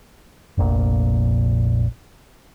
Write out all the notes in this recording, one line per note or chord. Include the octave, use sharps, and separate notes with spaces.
F1 A#1 A#2